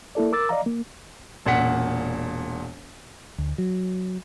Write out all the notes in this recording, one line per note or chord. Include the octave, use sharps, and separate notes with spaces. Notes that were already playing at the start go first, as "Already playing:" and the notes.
A#3 E4 A4 D5
A#4 D6 E6 A6
D5 D#5 F5 A#5
A#3
E1 A#2 C#4 F#5 B6
D2
F#3